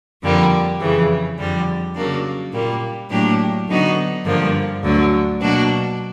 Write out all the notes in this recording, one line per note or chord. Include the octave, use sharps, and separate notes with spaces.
F2 D3 G3 A#3
F2 C#3 E3
F2 D3 G3
C#3 F#3 A#3 D4
A#2 G3 A#3
A2 F#3 A#3 D4 G4
D3 F#3 B3 D#4 F#4
G2 D3 F3 A#3
D2 D3 F#3
B2 F#3 A#3 D4 F#4